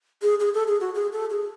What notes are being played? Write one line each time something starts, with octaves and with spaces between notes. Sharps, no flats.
G#4
G#4
A4
G#4
F#4
G#4
A4
G#4